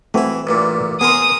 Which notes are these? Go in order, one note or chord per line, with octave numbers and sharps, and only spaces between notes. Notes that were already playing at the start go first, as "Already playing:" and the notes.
E3 A3 C4 E4 F#4
A1 G2 A#2
B3 G#4 A#4 C6 D#6